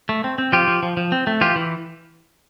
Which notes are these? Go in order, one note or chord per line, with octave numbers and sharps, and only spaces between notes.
A3
C4
C4
F3 F4 G4
F3
F3
F3
C4
A3
E3 F4 G4
E3